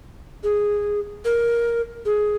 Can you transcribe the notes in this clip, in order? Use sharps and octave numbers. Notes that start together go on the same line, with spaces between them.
G#4
A#4
G#4